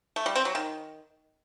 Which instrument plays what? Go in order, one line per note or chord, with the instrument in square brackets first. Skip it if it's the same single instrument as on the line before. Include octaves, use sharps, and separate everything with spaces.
[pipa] A3
G3
C4
F#3
D#3